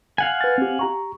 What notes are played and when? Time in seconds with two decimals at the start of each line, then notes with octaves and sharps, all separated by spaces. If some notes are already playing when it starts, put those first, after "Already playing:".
0.18 F5 F#5 G#5
0.41 B4 A6
0.58 C4 G4
0.79 G4 A#5 C#6